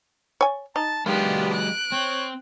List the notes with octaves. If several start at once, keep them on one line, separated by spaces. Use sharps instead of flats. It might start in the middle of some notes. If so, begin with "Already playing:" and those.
C#5 G#5
D#4 A5
D#3 F#3 G#3 B3 D4 F4 G4
F#6 D7
C4 C#5